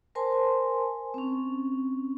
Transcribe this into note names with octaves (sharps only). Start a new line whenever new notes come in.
A#4 C5 G#5 A5 C6
C4 C#4